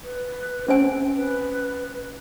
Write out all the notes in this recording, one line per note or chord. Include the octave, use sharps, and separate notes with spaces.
B4
C4 C#4 C5 G#5
B4